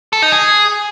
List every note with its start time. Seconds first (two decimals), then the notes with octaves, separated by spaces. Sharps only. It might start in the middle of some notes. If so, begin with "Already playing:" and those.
0.13 A4
0.22 D#4
0.32 G#4